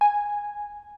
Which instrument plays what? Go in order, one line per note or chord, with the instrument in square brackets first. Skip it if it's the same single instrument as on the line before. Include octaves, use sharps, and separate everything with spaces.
[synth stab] G#5